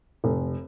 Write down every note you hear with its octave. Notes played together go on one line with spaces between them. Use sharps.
F1